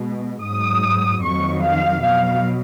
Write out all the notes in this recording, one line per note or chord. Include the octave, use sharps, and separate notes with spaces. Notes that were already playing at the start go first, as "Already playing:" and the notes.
Already playing: B2 G#3
G#2 F#3 D#6
F2 D#3 F#3 C#6
F5
B2 F#3 F5